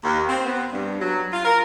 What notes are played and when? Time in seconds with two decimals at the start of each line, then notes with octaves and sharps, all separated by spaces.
0.04 D#2
0.29 C4
0.46 B3
0.72 G2
1.01 F#3
1.33 F4
1.45 A#4